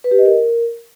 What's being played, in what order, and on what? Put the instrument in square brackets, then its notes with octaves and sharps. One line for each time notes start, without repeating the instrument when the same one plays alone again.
[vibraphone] B4
G4
D#5
A#4